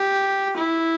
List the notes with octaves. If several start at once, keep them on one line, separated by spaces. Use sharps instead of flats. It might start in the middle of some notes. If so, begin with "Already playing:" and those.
Already playing: G4
E4